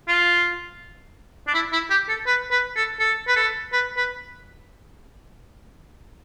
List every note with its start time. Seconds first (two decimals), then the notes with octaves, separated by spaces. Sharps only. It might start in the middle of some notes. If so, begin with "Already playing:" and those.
0.08 F4
1.47 D4
1.54 E4
1.72 E4
1.90 G4
2.09 A4
2.27 B4
2.51 B4
2.76 A4
3.00 A4
3.28 B4
3.36 A4
3.72 B4
3.97 B4